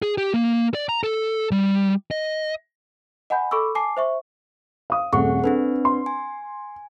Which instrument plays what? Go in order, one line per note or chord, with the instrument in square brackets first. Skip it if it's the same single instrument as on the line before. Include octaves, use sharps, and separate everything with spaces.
[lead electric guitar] G#4
G4
A#3
D5
A#5
A4
G3
D#5
[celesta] D#5 F#5 G#5 B5 G6
A4 B5 C#6 D6 E6
G#5 A5 D6 C7
C5 E5 C#6
[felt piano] F5 D#6
[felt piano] D#1 A3 C#6 [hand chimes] C4 G#4 F#5
[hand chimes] C4 D4 B4 [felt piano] A4
[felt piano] C6
[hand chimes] G#5